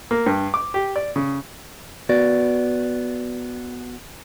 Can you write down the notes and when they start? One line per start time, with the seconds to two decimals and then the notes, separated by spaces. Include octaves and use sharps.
0.11 A#3
0.26 G2
0.54 D6
0.74 G4
0.96 D5
1.16 C#3
2.09 B3 F#4 D5